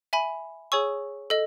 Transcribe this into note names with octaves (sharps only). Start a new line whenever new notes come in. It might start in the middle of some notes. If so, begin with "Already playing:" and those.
E5 G#5 B5
G#4 C#5 G#5 C#6 E6
A4 D#5